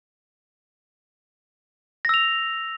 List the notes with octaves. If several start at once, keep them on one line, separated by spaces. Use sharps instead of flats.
E6 A#6 F7